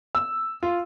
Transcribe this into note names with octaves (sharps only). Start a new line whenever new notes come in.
E6
F4